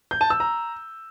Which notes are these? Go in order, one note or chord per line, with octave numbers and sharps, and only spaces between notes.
G6
A5
E6
A#5